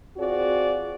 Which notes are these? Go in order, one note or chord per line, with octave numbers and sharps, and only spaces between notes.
C4 F4 F#4 G#4 D5